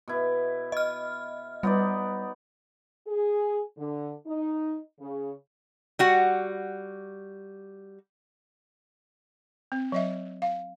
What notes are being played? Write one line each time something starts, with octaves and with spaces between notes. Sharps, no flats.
B2 E4
D#5 F6
G3 B3 D#4 D5
G#4
D3
D#4
C#3
G3 F#4 F#5
C4
F#3 D#5 E5
F5